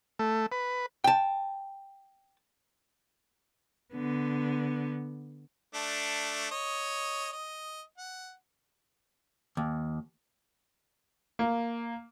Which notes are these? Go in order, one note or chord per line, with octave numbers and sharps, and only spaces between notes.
A3
B4
G5 A5
D3 B3
A3 D4
C#5 D#5
D#5
F#5
D#2
A#3